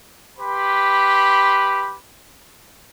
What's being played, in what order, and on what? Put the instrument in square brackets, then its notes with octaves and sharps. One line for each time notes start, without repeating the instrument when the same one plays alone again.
[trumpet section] G4 B4 B5 C6